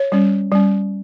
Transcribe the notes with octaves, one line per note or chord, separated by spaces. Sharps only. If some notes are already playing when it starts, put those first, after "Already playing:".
Already playing: C#5
G3 C#4
G3 C#4